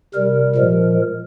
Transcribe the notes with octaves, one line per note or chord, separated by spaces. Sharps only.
C3 G3 A#4
A#2 F3 G#3